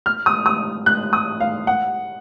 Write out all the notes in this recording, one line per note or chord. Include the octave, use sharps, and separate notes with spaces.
F6
D#6
D#6
F#6
D#6
F5
F#5